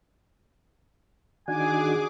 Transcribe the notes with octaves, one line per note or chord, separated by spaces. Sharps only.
D#3 D4 F#4 G#4 G#5 D6